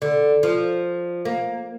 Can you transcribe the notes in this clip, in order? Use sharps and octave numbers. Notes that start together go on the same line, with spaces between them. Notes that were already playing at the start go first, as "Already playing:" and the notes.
D3
F3
A#3